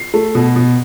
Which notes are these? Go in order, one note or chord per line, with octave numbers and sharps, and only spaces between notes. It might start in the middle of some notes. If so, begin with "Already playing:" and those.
Already playing: C7
A3
B2
B2